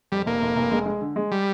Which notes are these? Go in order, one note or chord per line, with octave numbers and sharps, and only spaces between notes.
F2 G3
F1 A#3
F1
F1
G#3
G#3
D3
G#3
G3